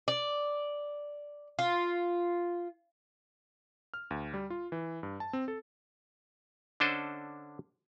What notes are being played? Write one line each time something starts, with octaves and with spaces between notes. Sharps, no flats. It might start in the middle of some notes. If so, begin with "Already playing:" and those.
D5
F4
F6
D2
G3
F4
E3
G2
A5
C4
A4
D3 C#4 D4 A4 C5 D#5